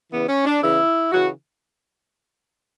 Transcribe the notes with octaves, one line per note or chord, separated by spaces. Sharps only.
E2 C#3 E3 B3
C#4
D4
E2 C#3 E3 E4
C#3 E3 F#4